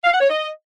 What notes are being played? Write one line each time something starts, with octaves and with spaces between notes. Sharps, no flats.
F5
F#5
C#5
D#5